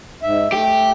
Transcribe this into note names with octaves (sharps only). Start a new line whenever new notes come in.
G#2 E5
A3 G4